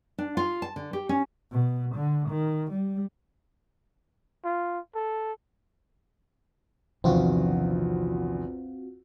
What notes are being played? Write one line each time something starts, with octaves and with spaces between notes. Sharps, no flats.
D4
F4
A5
D3
G4
C#4
B2
D3
D#3
G3
F4
A4
A#1 E2 C3 D#3 F3 C4 F4 F#4